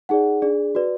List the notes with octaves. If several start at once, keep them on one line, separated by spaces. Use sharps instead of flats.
D#4 G#4 D5 F#5
D4 G#4 D5
F#4 B4 D5